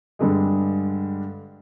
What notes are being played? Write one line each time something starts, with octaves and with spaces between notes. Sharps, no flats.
G2 D3 G#3